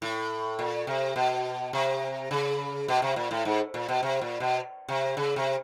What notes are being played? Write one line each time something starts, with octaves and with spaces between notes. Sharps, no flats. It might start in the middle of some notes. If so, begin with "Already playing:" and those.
A2
A#2
C3
B2
C3
C#3
B2
C3
A#2
A2
G#2
A#2
B2
C3
A#2
B2
C3
C#3
C3